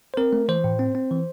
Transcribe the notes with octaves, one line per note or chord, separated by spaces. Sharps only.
C5
C4 A#4
A3
E3 C5
A2
C4
C4
E3